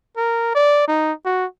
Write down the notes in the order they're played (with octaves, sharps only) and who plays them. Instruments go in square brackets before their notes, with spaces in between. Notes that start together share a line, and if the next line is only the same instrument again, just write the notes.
[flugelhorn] A#4
D5
D#4
F#4